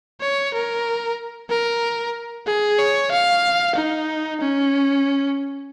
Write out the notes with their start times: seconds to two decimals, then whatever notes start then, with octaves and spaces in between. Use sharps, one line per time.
0.21 C#5
0.53 A#4
1.50 A#4
2.47 G#4
2.79 C#5
3.11 F5
3.75 D#4
4.40 C#4